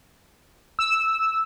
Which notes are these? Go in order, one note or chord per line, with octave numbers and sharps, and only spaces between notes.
E6